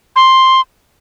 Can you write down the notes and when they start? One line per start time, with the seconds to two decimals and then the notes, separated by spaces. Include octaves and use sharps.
0.16 C6